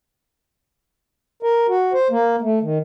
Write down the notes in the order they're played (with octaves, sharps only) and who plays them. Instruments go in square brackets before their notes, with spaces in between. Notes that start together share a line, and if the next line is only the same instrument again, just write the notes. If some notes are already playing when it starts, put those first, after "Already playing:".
[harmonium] A#4
F#4
C5
A#3
A3
D#3